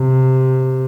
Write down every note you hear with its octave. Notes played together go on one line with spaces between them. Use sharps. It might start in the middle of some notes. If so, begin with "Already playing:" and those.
Already playing: C3